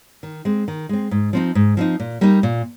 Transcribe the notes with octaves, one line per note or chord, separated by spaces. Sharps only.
D#3
G#3 C4
D#3
G#3 C4
G#2
F3 C4 D#4
G#2
F3 C4 D#4
A#2
G3 A#3 D#4
A#2